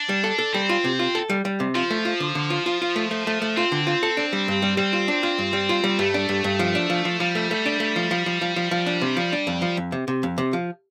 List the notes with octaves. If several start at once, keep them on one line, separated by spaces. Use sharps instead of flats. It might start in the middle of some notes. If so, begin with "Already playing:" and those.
Already playing: D4
G3
A4
A4
G3 C4
F4
C3
F4
A4
G3
G3
C3
F3 F4
A3
F4
D3
D3
F4
F4
F4
A3
A3
A3
A3
C4 F4
D3
F4
A4
D4
G3
G2
G3
G3 C4
F4
D4
F4
G2
G3
F4
G3
G2 A3
D4
G2
G2
F3
D4
F3
F3
F3 G3
A3
A3
D4
A3
F3
F3
F3
F3
F3
F3
D4
C3
F3
D4
F2
F3
F2
C3
C3
F2
C3
F3